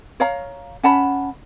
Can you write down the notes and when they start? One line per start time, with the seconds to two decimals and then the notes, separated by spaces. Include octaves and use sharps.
0.20 C#5 F5 A#5
0.83 C#4 F#5 A5 B5